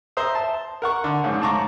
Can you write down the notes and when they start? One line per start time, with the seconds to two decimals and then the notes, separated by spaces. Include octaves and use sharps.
0.17 C5 E5 A#5 D#6
0.35 A5
0.82 A#4 F#5 C#6
1.04 D3
1.24 F2 G#2 C#3
1.42 G#2 A5 A#5 C#6 D6